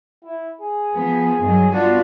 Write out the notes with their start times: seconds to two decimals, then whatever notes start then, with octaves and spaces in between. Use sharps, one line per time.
0.24 E4
0.61 G#4
0.94 F3 B3
1.41 G2 D#3 F#3
1.72 B3 D4 F4 F#4